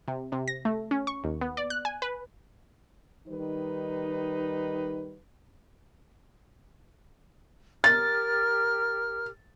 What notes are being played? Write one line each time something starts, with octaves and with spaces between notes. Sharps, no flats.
C3
C3
A#6
A3
C#4
C#6
D#2
B3
D5
F#6
G#5
B4
D#3 G3 D#4 B4
G4 A#4 F6 A6